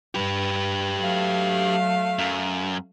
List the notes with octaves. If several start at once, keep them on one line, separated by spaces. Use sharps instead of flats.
G2 G4 B4
F#3 A3 F5
F#2